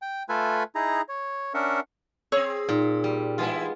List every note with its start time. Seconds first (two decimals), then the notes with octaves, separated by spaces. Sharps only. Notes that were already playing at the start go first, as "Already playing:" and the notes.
0.02 G5
0.29 A3 F4 A4 B4 E5 G#5
0.75 D#4 E4 G#4 A#5
1.09 C#5
1.54 C#4 D4 A#4 E5 F#5
2.32 C4 G#4 C#5 E6
2.69 A#2 D#4
3.04 G3
3.38 E3 G#3 B3 E4 F4